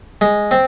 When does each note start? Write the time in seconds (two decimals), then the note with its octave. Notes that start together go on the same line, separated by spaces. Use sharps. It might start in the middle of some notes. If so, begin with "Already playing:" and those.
0.21 G#3
0.51 C4